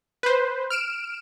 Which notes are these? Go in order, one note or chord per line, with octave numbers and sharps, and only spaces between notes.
B4 C5
F6 D7 E7